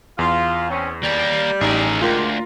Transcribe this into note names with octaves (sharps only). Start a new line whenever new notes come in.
E2 F4
C4 C#4
G3 A#3 G4
A1 D#4 G#4 A#4
D2 G#3 F4 G4 A#4